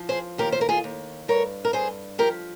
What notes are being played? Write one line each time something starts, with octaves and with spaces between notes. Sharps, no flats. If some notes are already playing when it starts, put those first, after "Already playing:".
Already playing: F3
G#4 C5
D#2 G4 A#4
C5
A#4
F4 G#4
D#2
G2 A#4 C#5
A#4
G2 G#4 C5
F3 G4 A#4